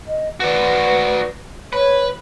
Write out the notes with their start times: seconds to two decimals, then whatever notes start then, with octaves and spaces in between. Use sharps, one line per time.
0.07 D#5
0.40 F#4 B4 D5
1.73 B4 C#5